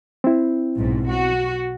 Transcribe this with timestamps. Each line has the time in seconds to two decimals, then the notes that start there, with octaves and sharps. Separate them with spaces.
0.24 C4 E4
0.76 B1 G#2
1.11 F#4